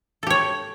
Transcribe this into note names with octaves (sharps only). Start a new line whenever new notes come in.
G4 A4 C#5